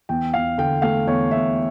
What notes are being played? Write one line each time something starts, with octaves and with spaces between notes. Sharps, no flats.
E2 G5
E2 F5
D3 G5
A3 F5
E2 C#5
E2 E5